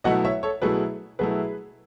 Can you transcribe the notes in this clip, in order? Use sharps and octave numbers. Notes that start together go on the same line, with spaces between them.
B2 F#3 A3 E4 D#5 F#5
C#5 E5
A4 C#5
B2 F#3 A3 E4 G#4 B4
B2 F#3 A3 E4 G#4 B4